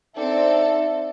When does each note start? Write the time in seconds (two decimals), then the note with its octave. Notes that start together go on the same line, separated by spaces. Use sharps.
0.16 C4 D4 D#4 A4 E5 G5